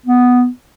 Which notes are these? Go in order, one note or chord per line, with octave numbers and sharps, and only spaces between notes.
B3